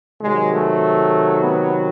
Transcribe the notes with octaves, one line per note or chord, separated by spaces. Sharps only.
C3 D#3 F#3 G#3
A3
B3